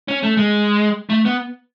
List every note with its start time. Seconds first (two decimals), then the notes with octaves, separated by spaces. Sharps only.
0.08 C#4
0.23 A3
0.37 G#3
1.10 A3
1.25 B3